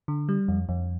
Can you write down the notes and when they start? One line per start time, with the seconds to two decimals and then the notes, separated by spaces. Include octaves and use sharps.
0.08 D3
0.29 G3
0.48 F2
0.69 F2